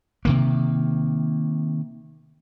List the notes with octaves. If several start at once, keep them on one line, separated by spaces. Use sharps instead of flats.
C3 D#3 A#3